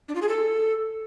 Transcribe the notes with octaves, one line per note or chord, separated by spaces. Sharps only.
D4
F4
G#4
A4